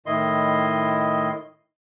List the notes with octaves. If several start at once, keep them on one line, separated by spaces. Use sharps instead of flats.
A2 D#3 E4 D#5 C6